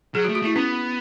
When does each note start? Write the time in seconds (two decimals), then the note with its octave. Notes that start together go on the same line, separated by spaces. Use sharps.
0.15 F#3 G#4
0.24 F#4
0.28 A3
0.35 F#4
0.42 A3 E4
0.56 B3 C#4